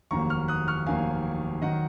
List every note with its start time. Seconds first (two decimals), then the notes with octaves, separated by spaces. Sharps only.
0.11 F1 D#2 D#3 F#3 A#3 A#5 C#6
0.30 C#6 F6
0.48 D#6 F#6
0.68 C#6 F6
0.86 F1 D#2 D#3 F#3 A#3 F5 G#5
1.62 D#3 F#3 D#5 F#5